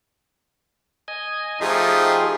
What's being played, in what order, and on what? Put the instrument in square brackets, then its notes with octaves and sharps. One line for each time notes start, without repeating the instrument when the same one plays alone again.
[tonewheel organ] D#5 G#5
[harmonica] F3 A3 D#4 [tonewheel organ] G4 G#4